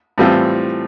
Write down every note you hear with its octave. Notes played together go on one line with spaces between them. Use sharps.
A2 E3 G3 C4 F4